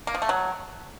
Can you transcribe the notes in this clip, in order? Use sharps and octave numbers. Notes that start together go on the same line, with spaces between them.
A#3
F3
A3
F#3